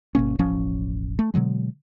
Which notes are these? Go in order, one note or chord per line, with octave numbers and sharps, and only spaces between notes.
G1 B2 A#3 C#4
E1 A1 F3 C#4
A3
B2 D3 F#3 G#3